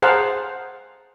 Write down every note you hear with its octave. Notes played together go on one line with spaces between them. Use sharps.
G#4 C5 F5 F#5 A5 A#5